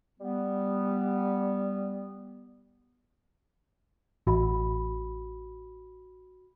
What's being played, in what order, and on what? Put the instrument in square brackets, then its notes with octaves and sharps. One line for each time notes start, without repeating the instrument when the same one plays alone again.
[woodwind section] G3 B3
[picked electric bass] A1 [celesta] F#4 B5